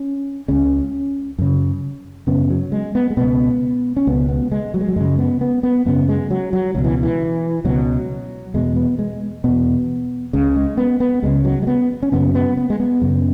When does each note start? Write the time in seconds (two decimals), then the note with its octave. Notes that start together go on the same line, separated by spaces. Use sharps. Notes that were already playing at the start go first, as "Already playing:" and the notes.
Already playing: C#4
0.48 C#2 C#3 C#4
1.38 F#2 C#3
2.27 F#2 C#3 B3
2.50 F#3
2.72 G#3
2.95 B3
3.10 G#3
3.17 C#2 B2 B3
3.97 C#4
4.07 C#2 B2 B3
4.29 B3
4.52 G#3
4.74 F#3
4.81 G#3
4.89 F#3
4.96 F#2 C#3 G#3
5.19 B3
5.41 B3
5.63 B3
5.86 F#2 C#3 B3
6.09 G#3
6.31 F#3
6.53 F#3
6.75 C#2 B2 F#3
6.84 E3
7.03 E3
7.65 C#2 B2 F#3
8.54 E2 B2 G#3
8.76 B3
8.99 G#3
9.44 E2 B2 B3
10.33 C#2 C#3
10.56 G#3
10.77 B3
11.00 B3
11.22 C#2 C#3 G#3
11.45 F#3
11.62 G#3
11.67 B3
12.03 C#4
12.12 F#2 C#3 B3
12.35 B3
12.57 B3
12.70 G#3
12.80 B3
13.02 F#2 C#3